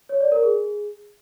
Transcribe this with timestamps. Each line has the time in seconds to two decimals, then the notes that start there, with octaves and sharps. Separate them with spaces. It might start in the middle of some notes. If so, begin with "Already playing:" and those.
0.09 C#5
0.21 D5
0.32 A#4
0.43 G#4